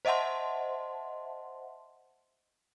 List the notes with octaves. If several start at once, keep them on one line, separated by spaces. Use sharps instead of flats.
C5 D#5 E5 F#5 A5 C6